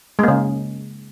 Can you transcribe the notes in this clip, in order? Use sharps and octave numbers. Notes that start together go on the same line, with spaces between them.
C#3 G#3 A#3